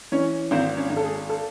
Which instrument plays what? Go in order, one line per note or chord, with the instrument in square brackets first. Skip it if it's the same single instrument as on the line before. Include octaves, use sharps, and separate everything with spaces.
[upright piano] E3 C#4 C#5
G#1 C4 C5
C#4 C#5
G#1
A4
G#4
A4